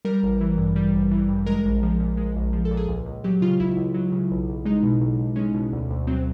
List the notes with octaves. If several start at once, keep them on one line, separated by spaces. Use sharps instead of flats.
G3 A#4
A1
E3
G2
G3
A1
E3
G2
G#3 A#4
A#1
F3
A#2
G#3
A#1
F3
A4
A#2
G#4
C#2
C#2
F#3 G4
C#3 F4
C#2 E4
C#2
F#3
C#3
B1
B1
G#3 D#4
B2
B1
B1
G#3 C#4
B2
D2
D2
F#3 C4